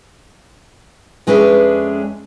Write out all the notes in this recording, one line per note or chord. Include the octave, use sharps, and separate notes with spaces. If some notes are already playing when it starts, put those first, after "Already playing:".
F2 G#3 C#4 D4 B4 E5